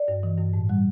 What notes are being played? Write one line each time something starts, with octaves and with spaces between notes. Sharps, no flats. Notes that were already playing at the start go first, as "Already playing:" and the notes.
Already playing: D5
G2
E3
G2
A2
G3